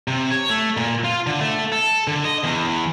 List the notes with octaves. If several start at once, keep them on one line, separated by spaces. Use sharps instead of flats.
C3
C#5
A3
A#2
F4
D3
A3
A4
D3
D#5
E2